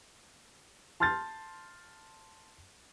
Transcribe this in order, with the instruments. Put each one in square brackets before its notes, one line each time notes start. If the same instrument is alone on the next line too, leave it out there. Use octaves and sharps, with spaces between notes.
[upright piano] A5 C6 F6 G6 A6